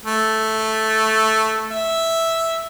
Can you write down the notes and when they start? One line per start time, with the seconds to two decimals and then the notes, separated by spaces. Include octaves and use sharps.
0.05 A3
1.71 E5